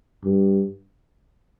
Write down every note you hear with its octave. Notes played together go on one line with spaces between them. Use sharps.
G2